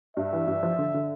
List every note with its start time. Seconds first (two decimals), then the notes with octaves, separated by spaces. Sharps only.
0.17 G2 E5
0.33 E3
0.47 G2
0.63 F3
0.79 D3
0.94 D3